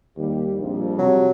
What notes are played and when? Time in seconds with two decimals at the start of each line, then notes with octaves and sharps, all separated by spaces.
0.17 D#2 G3 G4
0.59 A#1 F2 G3
0.99 C3 F#3